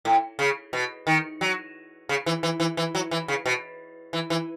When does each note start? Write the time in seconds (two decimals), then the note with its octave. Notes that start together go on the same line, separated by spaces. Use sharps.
0.05 A2
0.39 C#3
0.73 B2
1.07 D#3
1.41 F#3
2.09 C#3
2.26 E3
2.43 E3
2.60 E3
2.77 E3
2.95 F#3
3.11 E3
3.28 C#3
3.46 B2
4.13 E3
4.30 E3